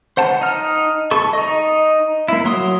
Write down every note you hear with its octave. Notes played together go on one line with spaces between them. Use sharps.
C5 F#5 A5
D#4 F6
A4 C#6
D#4 D#5
A#3 E4
F#3 C6 D#6